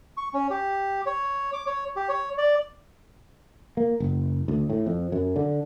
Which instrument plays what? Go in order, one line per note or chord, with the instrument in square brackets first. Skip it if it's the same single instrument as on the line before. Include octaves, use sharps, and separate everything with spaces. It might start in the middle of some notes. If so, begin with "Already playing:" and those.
[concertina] C#6
C#4
G4
C#5
D6
C#5
G4
C#5
D5
[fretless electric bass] A#3
F#1
D2
A2
F2
F#2
D3